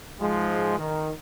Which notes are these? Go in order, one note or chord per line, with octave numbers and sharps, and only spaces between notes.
G#2 F3 G#3
D#3